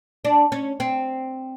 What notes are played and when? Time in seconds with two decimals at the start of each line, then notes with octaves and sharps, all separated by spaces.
0.25 D4
0.52 C#4
0.80 C4